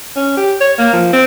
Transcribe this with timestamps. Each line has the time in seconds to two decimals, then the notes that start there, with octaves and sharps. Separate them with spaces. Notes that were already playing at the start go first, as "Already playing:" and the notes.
0.16 C#4
0.37 G4
0.61 C#5
0.78 A#3
0.93 F3
1.13 C4